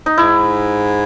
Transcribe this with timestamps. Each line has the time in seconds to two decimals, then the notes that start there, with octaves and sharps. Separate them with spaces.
0.06 D#4
0.17 G#2 E4